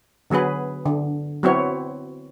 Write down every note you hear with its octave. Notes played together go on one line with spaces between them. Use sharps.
D3 F#3 B3 G#4 B4
D3
F#3 B3 C4 E4 F#4 C#5